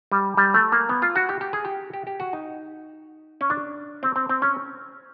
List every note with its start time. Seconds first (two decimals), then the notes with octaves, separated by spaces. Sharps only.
0.12 G3
0.37 G3
0.54 A3
0.72 A#3
0.89 B3
1.02 F4
1.16 F#4
1.29 G4
1.41 G4
1.53 G#4
1.65 G4
1.94 G4
2.07 G4
2.20 F#4
2.33 D#4
3.41 C#4
3.50 D4
4.03 C4
4.16 C4
4.29 C4
4.42 C#4